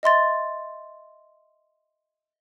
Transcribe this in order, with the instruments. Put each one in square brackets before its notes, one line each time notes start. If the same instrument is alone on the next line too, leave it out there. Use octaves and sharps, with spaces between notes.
[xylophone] D#5 E5 C6 A6